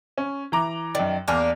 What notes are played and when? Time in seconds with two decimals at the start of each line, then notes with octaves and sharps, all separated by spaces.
0.18 C#4
0.52 E3 A#5 D6
0.95 F#2 D#3 D5
1.28 E2 A#3 D4 G#5 F6